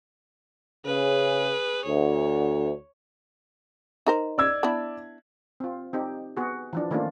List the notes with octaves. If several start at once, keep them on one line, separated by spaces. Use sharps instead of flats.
C#3 G#4 B4
D2 C#5
D#4 A#4 C5
D5 E6 G#6
B3 D4 E4
C4 F4
C4 D#4 G4
B3 F#4 G#4
E3 F3 D4
D#3 A3 A#3 C#4 D4 F4